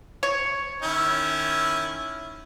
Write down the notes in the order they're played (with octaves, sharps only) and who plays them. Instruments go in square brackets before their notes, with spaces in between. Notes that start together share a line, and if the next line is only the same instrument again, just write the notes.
[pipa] C#5
[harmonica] D#3 C#4 E4